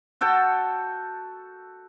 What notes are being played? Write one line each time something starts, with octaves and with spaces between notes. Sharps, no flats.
F#4 A4 G5 A5